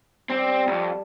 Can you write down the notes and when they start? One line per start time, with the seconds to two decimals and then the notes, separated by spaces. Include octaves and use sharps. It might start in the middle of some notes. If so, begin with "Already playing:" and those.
0.30 G3 C4
0.67 C2 F2 A5